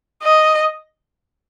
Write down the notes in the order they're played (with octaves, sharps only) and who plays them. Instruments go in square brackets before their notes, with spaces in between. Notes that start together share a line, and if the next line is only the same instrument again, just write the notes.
[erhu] D#5